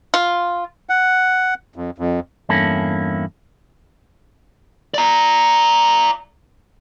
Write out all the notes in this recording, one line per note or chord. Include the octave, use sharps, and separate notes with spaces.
F4
F#5
F2
F2
E2 G2 A#3 C#4 E4 A4
D5 A#5